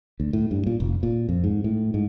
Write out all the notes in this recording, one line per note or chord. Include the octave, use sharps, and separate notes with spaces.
D2
A2
G2
A#2
F1
A#2
F2
G#2
A2
G#2